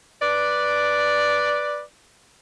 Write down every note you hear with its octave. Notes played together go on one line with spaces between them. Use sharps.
B4 D5